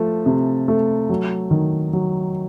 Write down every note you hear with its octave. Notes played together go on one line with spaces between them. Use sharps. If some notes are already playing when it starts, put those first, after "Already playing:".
Already playing: F3 A3
C3
A3
F#3
D#3
F#3